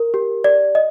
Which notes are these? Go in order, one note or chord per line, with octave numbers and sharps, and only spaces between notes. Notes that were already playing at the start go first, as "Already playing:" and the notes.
Already playing: A#4
G4
D5
D#5